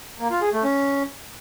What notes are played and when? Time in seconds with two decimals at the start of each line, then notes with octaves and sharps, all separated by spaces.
0.20 A#3
0.31 F4
0.42 G#4
0.53 A3
0.64 C#4